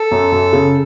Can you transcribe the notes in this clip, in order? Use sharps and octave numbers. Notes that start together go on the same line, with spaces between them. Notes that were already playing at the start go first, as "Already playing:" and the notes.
Already playing: A4
F#2
F#2
C#3